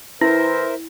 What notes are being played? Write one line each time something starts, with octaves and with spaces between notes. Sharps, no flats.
E3 E4 A#4 C5 E5 A#6